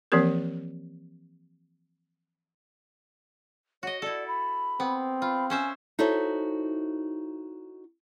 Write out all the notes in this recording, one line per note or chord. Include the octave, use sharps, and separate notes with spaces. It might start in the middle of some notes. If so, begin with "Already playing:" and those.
E3 F3 A#3 C4 G4 A#4
F#4 C#5 D#5
E4 A4 D5
B5
B3 C4
F4 B5
C#4 C5 E5 G#5
D#4 E4 F#4 A4 C5 C#5